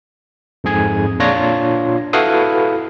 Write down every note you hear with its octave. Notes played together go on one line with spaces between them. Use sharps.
F2 G#2 G#4 G#6
A#2 D4 F4 C#5 A#6
E4 F#4 A4 B4 F5 D#6